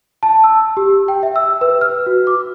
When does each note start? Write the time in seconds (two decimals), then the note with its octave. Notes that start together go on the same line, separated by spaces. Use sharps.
0.23 A5
0.44 E6
0.77 G4
1.08 G5
1.23 E5
1.36 E6
1.61 B4
1.81 F6
2.06 F#4
2.27 D6